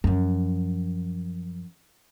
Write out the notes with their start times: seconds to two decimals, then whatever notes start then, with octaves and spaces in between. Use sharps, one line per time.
0.04 F#2 F3